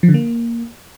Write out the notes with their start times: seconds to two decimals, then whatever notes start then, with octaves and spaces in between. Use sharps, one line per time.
0.03 F3
0.09 D3
0.14 A#3